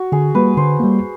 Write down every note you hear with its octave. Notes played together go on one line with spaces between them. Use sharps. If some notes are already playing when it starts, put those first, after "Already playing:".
Already playing: F#4
D3 G#4
G3 A#3 B4
D3 C5
G3 A#3